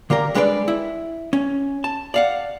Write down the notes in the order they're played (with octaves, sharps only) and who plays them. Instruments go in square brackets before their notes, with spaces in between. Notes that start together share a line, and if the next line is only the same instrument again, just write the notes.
[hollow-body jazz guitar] D3 A#3 G4 A#4
G3 G#3 D4 B4 C#5 D5
E4
C#4
A5
D5 F5 F#5